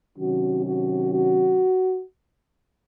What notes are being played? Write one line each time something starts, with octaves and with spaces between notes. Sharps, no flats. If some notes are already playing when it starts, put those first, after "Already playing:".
C3 D#3 F#3 C#4 F#4
F#4
F#4